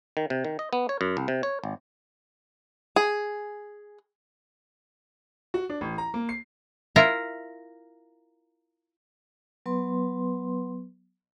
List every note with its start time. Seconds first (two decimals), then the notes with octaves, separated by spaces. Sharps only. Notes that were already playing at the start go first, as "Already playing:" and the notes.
0.17 D#3
0.30 C3
0.44 D#3
0.59 D#5
0.73 B3
0.89 C#5
1.01 F#2
1.17 C2
1.28 C3
1.43 C#5
1.64 G#1
2.96 G#4
5.54 F#4
5.70 D4
5.81 A1
5.98 A#5
6.14 A#3
6.29 C7
6.96 E4 F4 A#4 A#5
9.66 F#3 B3 B4 C6